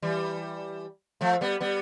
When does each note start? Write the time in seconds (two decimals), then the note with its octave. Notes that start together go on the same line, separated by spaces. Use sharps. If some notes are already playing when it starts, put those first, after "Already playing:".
0.02 E3 G3
1.21 F3 A3
1.41 G3 B3
1.60 G3 B3